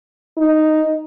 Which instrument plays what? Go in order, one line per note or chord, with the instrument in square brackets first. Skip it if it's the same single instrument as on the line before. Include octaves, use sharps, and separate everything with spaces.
[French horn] D#4